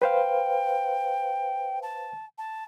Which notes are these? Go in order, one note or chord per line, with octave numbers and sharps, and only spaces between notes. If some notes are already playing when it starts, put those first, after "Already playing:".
B4 C5 F5 G5
A5
A5